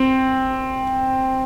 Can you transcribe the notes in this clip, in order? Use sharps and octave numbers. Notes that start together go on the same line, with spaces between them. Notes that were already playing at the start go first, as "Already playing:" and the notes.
Already playing: C4